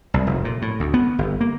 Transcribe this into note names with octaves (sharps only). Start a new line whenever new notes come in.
C2
F1
A#2
A2
D2
B3
G1
A#3